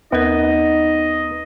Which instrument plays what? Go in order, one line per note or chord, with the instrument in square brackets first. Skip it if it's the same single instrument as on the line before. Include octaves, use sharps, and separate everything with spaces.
[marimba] D#2 A#4 [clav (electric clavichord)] B3 [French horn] D#4 [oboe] D#5